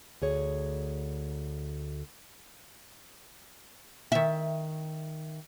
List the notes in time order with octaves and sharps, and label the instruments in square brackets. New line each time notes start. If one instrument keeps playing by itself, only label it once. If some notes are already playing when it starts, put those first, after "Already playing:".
[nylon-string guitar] D2 G#4 C#5
[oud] D#3 E5